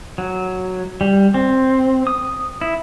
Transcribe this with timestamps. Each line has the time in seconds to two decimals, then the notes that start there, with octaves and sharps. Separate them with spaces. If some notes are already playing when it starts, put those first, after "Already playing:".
0.18 F#3
1.01 G3
1.34 C4
2.07 D#6
2.61 E4